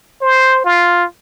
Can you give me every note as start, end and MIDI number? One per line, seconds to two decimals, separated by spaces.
0.22 0.62 72
0.65 1.05 65